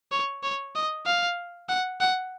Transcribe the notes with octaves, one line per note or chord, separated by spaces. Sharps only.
C#5
C#5
D#5
F5
F#5
F#5